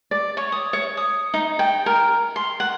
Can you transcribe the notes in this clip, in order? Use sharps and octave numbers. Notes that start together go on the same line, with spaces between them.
D5
C#5
D#6
C#5
D#6
D#4
G5
A#4
C6
F#5